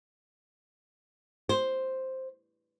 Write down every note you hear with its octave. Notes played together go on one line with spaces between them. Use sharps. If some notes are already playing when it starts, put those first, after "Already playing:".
C5